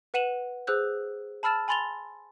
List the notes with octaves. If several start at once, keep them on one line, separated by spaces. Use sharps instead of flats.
B4 F#5 D#7 E7 F#7
G#4 C5 E6 F#6 G6
A5 B5 E6 F6 A6 E7
G#5 B5 C6 A6 F7 G7